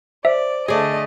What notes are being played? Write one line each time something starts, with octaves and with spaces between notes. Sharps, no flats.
C5 D5 E5
D3 A3 G#4 D5 D#5